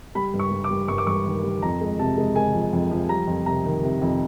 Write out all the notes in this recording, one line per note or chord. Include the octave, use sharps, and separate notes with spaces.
G3 B5
G2
C#6
G3
D6
G3
G2 C#6
D6
G2 C#6
D#3
G3
F2 A#5
G#3
C3 A5
G#3
G#3 G#5
F3
F2
F3
G3 A#5
F2
C3 A#5
D#3
C3
F2